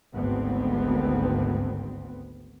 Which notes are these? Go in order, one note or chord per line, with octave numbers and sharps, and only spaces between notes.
G#1 D2 B3 C4